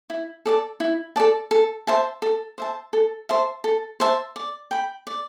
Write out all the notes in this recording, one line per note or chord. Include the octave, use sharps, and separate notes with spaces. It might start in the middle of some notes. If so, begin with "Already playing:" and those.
E4
A4 D5 A5
E4
A4 D5 A5
A4
C5 E5 A5
A4
C5 E5 A5
A4
C5 E5 A5
A4
C5 E5 A5
D5
G5 B5
D5